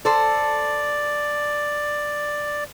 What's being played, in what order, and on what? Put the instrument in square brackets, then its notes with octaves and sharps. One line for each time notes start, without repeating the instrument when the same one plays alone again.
[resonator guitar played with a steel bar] A4 C5 [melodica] D5